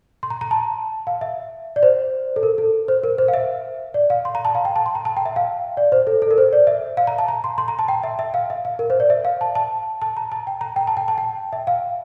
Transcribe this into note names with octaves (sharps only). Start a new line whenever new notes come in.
C6
A#5
A#5
A5
F5
E5
D5
C5
A4
A#4
A4
C5
A#4
C5
F5
E5
D5
F5
C6
A#5
A5
F5
G5
A5
C6
A#5
A5
G5
E5
F5
D5
C5
A4
A4
A#4
C5
D5
E5
F5
A#5
A5
A#5
C6
C6
A#5
A5
G5
E5
E5
F5
E5
F5
A#4
C5
D5
E5
F5
A5
A5
A5
A#5
A5
G5
A#5
G5
A5
G5
A5
G5
E5
F5